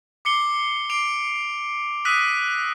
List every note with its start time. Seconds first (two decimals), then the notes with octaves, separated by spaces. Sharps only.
0.25 D6 C7 C#7 G7
0.90 D6 C7 D7 F7 G7
2.05 D#6 E6 F#6 A#6 B6 D#7